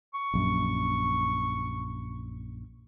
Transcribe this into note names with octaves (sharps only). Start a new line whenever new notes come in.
C#6
A#1 F#2